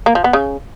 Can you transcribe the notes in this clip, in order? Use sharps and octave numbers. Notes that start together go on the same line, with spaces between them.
A#3
F3
B3
C#3